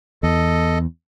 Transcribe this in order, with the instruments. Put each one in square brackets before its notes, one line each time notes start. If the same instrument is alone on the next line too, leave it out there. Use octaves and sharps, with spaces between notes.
[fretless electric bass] E2 [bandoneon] A4 D#5